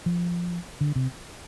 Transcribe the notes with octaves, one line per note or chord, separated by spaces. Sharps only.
F3
D3
C3